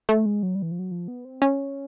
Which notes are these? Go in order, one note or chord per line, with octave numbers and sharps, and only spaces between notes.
A3
G#3
F#3
G3
E3
F3
F#3
F3
B3
C4
C#4